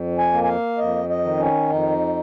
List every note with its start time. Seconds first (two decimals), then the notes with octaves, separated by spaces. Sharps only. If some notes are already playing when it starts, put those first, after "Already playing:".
Already playing: F2
0.18 G#5
0.33 A#3
0.44 G#5
0.48 F5
0.78 F2 D#5
1.09 D#5
1.24 D#3
1.39 C#4
1.69 F2 D#4